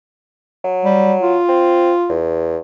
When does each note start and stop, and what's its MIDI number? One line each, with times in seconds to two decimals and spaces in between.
0.64 1.38 54
0.85 1.14 55
1.22 2.17 65
1.49 1.92 60
2.09 2.58 40